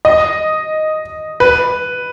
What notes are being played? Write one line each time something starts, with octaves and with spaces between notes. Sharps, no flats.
D#5
B4